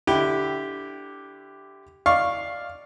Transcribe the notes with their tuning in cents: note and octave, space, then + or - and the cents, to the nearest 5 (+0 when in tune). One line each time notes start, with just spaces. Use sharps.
D3 +0 E4 +0 G4 +0
D5 -5 F5 +0 C#6 -15